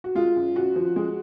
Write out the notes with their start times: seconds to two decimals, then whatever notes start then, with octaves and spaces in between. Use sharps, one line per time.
0.04 F#4
0.15 G#3 F4
0.36 F#2
0.56 F#2 F#4
0.76 F3
0.96 G#3